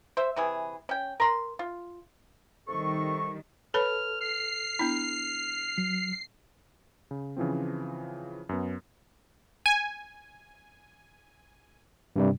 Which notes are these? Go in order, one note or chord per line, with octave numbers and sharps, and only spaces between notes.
C5 E5
C3 E3 G#4
C#4 G5
A#4 C6
F4
C3 D#3 G3 A4 C#6
A4 B4 C#5 B5 F6
F6 C7
B3 D4 E4
F#3
C#3
C#3 E3 F3 C4
F#2 B3
G#5
G2 C3 G3